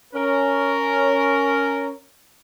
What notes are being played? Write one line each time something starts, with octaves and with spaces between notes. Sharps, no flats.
C#4 A#4